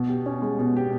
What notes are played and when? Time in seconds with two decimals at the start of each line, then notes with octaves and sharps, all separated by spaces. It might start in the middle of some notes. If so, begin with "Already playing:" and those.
Already playing: B2
0.09 G4
0.26 C#4
0.42 G#3
0.59 B2
0.76 G4